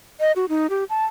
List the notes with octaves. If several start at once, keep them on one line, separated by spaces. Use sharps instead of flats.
D#5
F#4
D#4
G4
A5